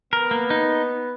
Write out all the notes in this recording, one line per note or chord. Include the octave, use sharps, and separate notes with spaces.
B3 A#4
A#3
D#4